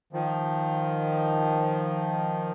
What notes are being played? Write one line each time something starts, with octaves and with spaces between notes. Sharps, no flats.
D#3 F3